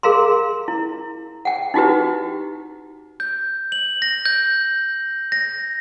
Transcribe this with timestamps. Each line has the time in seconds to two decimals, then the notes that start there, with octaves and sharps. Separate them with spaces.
0.03 G#4 A#4 F5 A#5 C6
0.68 E4
1.45 F#5 G5
1.74 D#4 E4 F#4 G4 B4
3.20 G6
3.72 F#7
4.02 A#6
4.25 G6
5.32 A#6